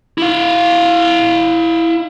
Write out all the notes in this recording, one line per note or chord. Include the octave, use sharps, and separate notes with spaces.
E4 F5